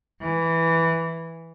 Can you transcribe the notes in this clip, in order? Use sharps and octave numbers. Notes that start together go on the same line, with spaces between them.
E3